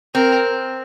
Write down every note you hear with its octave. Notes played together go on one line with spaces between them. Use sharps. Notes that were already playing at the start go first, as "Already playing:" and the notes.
C4 A#4